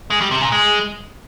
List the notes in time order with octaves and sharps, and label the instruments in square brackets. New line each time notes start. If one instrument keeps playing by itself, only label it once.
[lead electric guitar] G#3
G3
C3
A#2
G#3